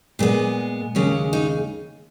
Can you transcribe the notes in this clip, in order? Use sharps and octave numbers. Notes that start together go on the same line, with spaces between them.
A#2 G#3 B3
D#2 C#3 G#3 C#4
D#4